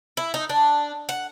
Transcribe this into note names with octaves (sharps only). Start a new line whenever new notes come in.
E4
D#4
D4
F#5